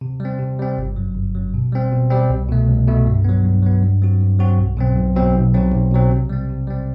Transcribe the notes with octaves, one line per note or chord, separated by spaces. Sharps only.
C3
G3
C4
C3
G3 C4
G1
F#2 F#3
G1
F#2 F#3
B2
G3 C4
B2
G3 C4
C2
B2 A3
C2
B2 A3
G2
F#3 B3
G2
F#3 B3
G2
F#3 C4 F#4
G2
F#3 C4 F#4
B1
B2 F#3 C4
B1
B2 F#3 C4
B1
B2 F#3 C4
B1
B2 F#3 C4
C3
G3 C4
C3
G3 C4